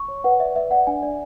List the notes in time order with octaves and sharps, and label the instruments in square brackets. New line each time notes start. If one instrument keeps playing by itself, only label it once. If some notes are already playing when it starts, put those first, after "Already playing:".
Already playing: [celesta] C#6
C#5
B4 F#5
D5 E5
B4 E5
D5 F#5
D4 G#5
D5